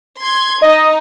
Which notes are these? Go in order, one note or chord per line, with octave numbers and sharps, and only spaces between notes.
C6 G#6
D#4 D#5